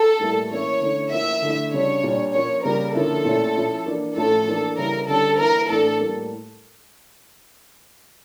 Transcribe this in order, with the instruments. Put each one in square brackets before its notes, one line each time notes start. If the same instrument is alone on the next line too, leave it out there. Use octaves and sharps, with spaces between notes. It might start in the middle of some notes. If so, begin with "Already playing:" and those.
Already playing: [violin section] A4
[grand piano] A2 G3 A#3 E4
[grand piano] E3 A#3 C#4 E4 [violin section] C#5
[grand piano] D3 A3 C#4 E4
[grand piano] F3 A#3 E4 [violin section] E5
[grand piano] D3 A3 E4
[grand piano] C#3 G3 D4 [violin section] C#5
[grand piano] A#2 G3 D4
[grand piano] F3 A#3 C#4 [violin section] C#5
[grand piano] C#3 G3 A#3 C#4 [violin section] A#4
[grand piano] D3 F3 A#3 C#4 E4 [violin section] A4
[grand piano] A#2 A3 C#4 E4
F3 C#4 E4
E3 A#3 D4
[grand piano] A2 F3 C#4 E4 [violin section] A4
[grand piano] E3 A#3 D4
[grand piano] C#3 G3 C#4 E4 [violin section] A#4
[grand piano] D3 G3 C#4 [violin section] A4
[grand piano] E3 A#3 E4 [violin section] A#4
[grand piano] A2 E3 A3 D4 [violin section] A4
[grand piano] A2 G3 A#3